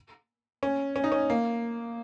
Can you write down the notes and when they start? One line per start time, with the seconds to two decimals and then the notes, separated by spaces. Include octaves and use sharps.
0.63 C#4
0.96 C#4
1.04 D#4
1.12 C#4
1.30 A#3